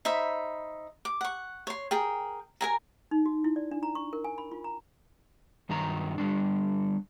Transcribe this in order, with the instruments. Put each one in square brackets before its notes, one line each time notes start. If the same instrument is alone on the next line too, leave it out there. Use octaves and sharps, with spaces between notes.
[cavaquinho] D#4 C5 E5 B5
D6
F#5 C#6
C#5 C6
G#4 A#4 G5
A#4 G#5 A#5
[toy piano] D#4
F#4
E4
D5
D4
A#5
C#6
A#4
G#5
B5
F4
A#5
[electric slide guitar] G2 D#3 F#3 D#4 A#5
D3 G3 D4